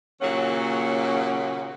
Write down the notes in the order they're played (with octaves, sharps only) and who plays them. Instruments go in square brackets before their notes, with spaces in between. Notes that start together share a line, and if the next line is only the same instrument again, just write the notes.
[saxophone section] D#2 A#2 C#3 F#3 C#4 F#5